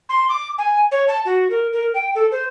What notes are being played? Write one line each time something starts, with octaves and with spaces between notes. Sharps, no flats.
C6
D6
G#5
C#5
A5
F#4
A#4
A#4
G5
A4
C5